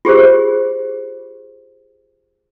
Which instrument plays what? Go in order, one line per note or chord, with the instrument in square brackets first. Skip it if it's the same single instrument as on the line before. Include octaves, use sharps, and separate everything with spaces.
[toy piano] F4 G4 G#4 C5